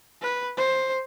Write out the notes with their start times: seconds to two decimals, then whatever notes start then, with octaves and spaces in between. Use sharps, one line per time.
0.22 B4
0.57 C5